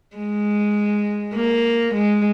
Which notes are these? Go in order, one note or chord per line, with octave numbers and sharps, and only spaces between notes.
G#3
A#3
G#3